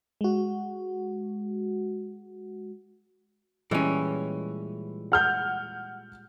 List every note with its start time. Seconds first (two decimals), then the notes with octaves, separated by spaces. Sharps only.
0.21 G#3 F#4
3.71 A#2 E3 G3 G#3 C#4
5.12 F#5 F6 G6